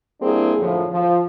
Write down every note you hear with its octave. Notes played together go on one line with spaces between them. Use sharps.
G3 A#3 C4 D4 E4 G#4
F#2 A2 D3 F3
F3